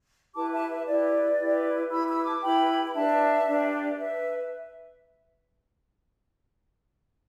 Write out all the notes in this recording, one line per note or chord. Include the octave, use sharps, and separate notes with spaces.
E4 G4 B4 A5 D6
E5 A5
E5
E4 G4 B4 D5
E4 G4 B4
E4 G4 B4 B5 E6
B5 E6
A5 D6
E4 G4 B4 G5 B5
B5
D4 G4 B4 E5 A5
D4 G4 B4
B4 E5